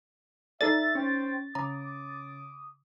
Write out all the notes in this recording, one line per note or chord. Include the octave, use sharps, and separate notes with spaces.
D#4 A4 D5 E5 A6
C#4 C5 G5
C#3 A#5 D6 D#6